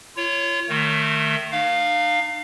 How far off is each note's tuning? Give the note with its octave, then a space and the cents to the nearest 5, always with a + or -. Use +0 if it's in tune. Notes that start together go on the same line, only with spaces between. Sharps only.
F4 -35 C#5 +0
D#3 -20 A3 +10
D#4 -40 F5 +5